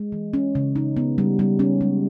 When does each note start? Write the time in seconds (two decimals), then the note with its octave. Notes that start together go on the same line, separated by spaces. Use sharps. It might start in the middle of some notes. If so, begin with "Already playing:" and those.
Already playing: G#3
0.12 E3
0.34 C#4
0.55 C#3
0.76 D#4
0.97 B3
1.18 G3
1.39 G3
1.59 C#4
1.81 G#3